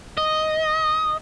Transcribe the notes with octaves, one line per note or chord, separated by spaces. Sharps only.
D#5